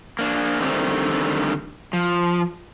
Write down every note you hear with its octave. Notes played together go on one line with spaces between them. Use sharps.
A#3 D4
D3 D#3 G3 A3 C4
F3